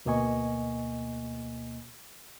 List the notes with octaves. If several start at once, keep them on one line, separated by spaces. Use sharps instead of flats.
D2 B2 A#3 D#5 G#5 C#6